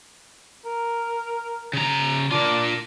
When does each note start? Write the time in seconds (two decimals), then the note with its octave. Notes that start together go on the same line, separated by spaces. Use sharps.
0.66 A#4
1.73 C#3 A#5
2.32 D4 F4 A#4